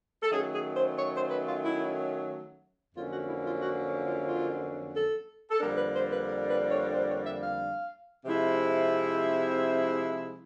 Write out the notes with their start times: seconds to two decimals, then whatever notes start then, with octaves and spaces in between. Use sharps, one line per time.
0.23 A4
0.30 D#3 F#3 A3 C#4 G#4
0.53 G#4
0.75 C5
0.97 C#5
1.13 C5
1.30 B4
1.46 F4
1.63 E4
2.95 F2 D3 F#3 A#3 C#4 F4
3.11 F#4
3.28 E4
3.45 F4
3.61 F#4
4.06 F4
4.27 F4
4.94 A4
5.50 A4
5.60 F2 D3 G3 A#3 D4 A#4
5.76 B4
5.93 C5
6.10 B4
6.26 A#4
6.49 B4
6.71 C#5
6.93 C5
7.09 C#5
7.26 E5
7.42 F5
8.25 C3 F3 G#3 C4 E4